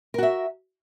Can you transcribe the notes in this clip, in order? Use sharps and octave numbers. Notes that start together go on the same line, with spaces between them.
F#4 A#4 E5